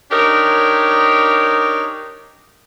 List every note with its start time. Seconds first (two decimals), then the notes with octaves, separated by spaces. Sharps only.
0.11 D4 D#4 G4 A#4 C#5